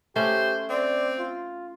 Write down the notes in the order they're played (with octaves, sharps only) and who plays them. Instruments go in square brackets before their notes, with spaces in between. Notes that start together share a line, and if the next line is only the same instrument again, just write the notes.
[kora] A3 C#4 [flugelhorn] G4 [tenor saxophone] C5
[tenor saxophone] C4 [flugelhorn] D5
[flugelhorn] F4